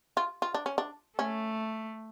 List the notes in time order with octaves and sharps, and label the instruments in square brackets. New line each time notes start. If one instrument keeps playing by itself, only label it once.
[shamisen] F4
F4
D4
C#4
D4
[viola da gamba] A3 [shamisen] C#4